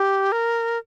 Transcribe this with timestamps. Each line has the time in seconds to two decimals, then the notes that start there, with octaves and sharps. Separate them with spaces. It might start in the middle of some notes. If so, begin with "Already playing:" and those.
Already playing: G4
0.32 A#4